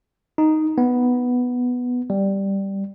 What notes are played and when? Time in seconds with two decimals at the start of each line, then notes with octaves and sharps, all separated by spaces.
0.38 D#4
0.78 B3
2.10 G3